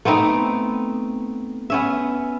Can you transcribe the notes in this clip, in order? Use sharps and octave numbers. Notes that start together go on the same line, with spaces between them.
A3 B3 C4 D#4
B3 C#4 E5